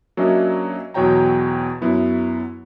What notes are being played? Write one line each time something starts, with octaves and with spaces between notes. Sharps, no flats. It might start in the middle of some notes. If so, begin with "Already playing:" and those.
F#3 A#3 C#4 D4 D#5 E5
E2 B2 F#3 C#5 G5 A#5
F#2 F#3 B3 E4